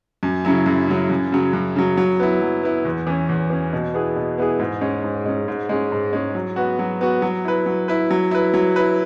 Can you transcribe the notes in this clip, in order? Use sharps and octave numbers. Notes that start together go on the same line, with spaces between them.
F#2
C#3 F#3 E4
F#2
C#3 F#3 E4
F#2
C#3 F#3
F#2
C#3 F#3
F#3
B3 E4
F#3
B3 E4
E2
E3 C#4
E2
E3 C#4
B2
B3 E4 G#4
B2
B3 E4 G#4
G#2
G#3 C#4
G#2
G#3 C#4
G#2
G#3 C#4
G#2
G#3 C#4
F#3
B3 F#4
F#3
B3 F#4
F#3
E4 B4
F#3
E4 B4
F#3
E4 B4
F#3
E4 B4